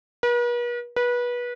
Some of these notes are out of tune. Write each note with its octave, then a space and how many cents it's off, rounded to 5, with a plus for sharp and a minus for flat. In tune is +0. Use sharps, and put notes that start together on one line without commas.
B4 -45
B4 -25